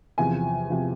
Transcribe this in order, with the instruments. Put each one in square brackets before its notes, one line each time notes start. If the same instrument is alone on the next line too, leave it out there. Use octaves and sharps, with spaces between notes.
[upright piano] E2 C3 F3 G#5
C3 F3